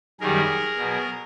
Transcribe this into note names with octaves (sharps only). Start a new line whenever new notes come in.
F#2 D#3 G3 G#4 A#4
B2 F#3